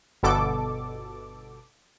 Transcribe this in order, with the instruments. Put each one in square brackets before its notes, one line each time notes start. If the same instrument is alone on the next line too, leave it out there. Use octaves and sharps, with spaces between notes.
[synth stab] G1 B2 A4 D6